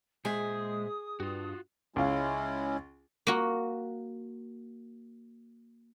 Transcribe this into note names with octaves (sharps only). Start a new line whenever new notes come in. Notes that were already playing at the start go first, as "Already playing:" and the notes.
A#2 G#3 G#4 C5 E5 D#6
G2 F4 F#4
C#2 G#3 C#4 E4 F5
A#3 F#4